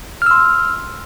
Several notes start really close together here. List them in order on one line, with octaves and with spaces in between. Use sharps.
F6 E6 C6